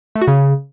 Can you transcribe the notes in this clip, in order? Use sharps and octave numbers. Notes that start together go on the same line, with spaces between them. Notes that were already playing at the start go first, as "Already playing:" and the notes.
A3
F#4
C#3